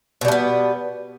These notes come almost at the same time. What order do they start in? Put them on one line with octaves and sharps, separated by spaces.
B2 G3 A3 B3